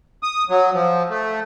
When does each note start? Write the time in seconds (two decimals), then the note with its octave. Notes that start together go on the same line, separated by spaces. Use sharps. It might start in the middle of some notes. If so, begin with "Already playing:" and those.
0.23 D#6
0.49 F#3
0.74 F3
1.09 A3